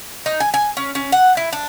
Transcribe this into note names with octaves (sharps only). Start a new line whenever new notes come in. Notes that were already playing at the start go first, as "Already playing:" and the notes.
D#4
G#5
G#5
C#4
C#4
F#5
E4
D4